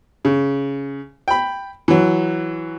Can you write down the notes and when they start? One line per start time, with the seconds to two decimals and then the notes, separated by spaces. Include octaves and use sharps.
0.25 C#3
1.28 G5 B5
1.88 E3 F#3